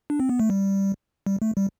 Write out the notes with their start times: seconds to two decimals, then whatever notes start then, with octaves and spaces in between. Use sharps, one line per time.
0.10 D4
0.20 C4
0.29 B3
0.40 A3
0.50 G3
1.26 G3
1.42 A3
1.57 G3